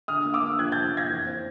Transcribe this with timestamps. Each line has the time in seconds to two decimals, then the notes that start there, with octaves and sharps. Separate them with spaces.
0.08 D3 D#6 F6
0.25 A#3
0.34 D6 E6
0.42 D3
0.59 F3 F#6 G#6
0.72 D3 G6 A6
0.93 A#3 G#6 A#6
1.10 E3
1.27 C4